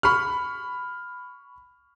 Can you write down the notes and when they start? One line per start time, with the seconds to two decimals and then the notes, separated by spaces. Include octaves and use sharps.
0.03 B5 C#6 F6